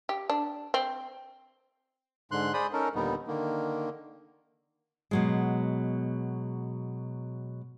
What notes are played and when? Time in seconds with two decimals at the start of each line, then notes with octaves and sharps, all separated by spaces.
0.09 G4
0.30 D4
0.74 C4
2.31 G#2 D3 C6 F#6
2.54 G#4 C5 D5 B5 D#6
2.73 C#4 D#4 A4 A#4
2.95 D#2 A#2 D3 G3 B3 D#4
3.27 D3 D#3 A#3
5.11 B2 F#3 G#3